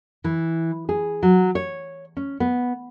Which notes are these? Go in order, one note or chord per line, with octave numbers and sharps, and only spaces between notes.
E3
G#4
F#3
C#5
C#4
B3